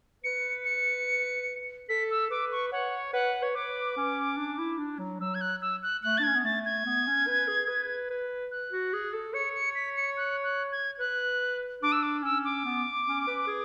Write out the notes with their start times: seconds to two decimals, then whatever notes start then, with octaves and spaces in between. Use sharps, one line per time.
0.24 B4 C#7
0.65 C#7
1.89 A4 B6
2.11 E6
2.31 B4 D6
2.52 C#6
2.72 C#5 F#5
3.13 B4 F#5
3.42 C#5
3.55 B4 D6
3.97 C#4
4.37 D4
4.58 E4
4.78 D4
4.99 F#3
5.20 F#3 E6
5.35 G#6
5.41 F#6
5.62 E6
5.83 F#6
6.03 A3 F#6
6.18 D4 A6
6.23 C#4 G#6
6.36 B3
6.44 A3 A6
6.65 G#6
6.86 B3
7.07 C#4
7.27 B4
7.48 G#4
7.68 B4
8.10 B4
8.51 F#6
8.71 F#4
8.93 G#4
9.13 A4
9.34 C#5 C#7
9.55 C#7
9.75 B6
9.96 C#7
10.17 F#6
10.44 F#6
10.72 G#6
10.99 B4 F#6
11.83 D4 D6
11.92 E6
12.03 D6
12.23 C#4 E6
12.45 D6
12.65 B3
13.07 C#4
13.27 B4
13.47 G#4